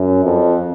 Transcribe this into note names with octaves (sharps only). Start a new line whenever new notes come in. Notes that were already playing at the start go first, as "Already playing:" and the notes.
Already playing: F#2
F2